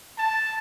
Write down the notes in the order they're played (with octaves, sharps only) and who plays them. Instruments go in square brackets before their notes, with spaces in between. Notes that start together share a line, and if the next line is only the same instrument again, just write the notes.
[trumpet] A5